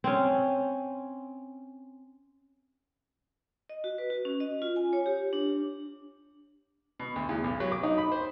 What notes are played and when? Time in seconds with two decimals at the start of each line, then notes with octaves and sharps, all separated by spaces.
0.04 C4 C#4
3.70 D#5
3.84 F#4
3.98 B4
4.10 F#4
4.25 C#4
4.40 D#5
4.62 F4
4.76 G#5
4.93 C#5
5.06 G4
5.33 D4
7.00 B2
7.16 D2
7.29 E2
7.44 B1
7.60 F#3
7.72 D6
7.83 D#4
7.98 B5
8.12 C5